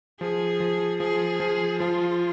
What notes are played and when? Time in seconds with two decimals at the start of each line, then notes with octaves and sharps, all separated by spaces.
0.20 F3 G#4
0.60 F3
1.00 F3 G#4
1.40 F3
1.80 F3 F4